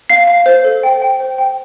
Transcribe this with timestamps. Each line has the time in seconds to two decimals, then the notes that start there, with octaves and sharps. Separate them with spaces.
0.10 F5 C7
0.27 F5
0.46 C5
0.64 A4
0.83 G5
1.02 G5
1.20 C5
1.38 G5